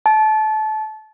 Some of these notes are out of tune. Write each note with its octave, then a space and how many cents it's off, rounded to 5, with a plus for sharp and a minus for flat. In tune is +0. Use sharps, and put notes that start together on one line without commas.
A5 -25